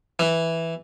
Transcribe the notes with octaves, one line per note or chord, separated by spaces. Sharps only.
E3